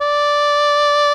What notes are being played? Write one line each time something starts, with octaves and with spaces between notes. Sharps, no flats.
D5